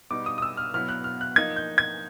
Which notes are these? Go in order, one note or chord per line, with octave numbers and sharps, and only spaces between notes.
B2 G3 B3 D#4 D6
D#6
D#6
E6
F6
B2 F#3 B3 E4 F6
F#6
F6
F#6
F3 A#3 D#4 G#6
G6
G#6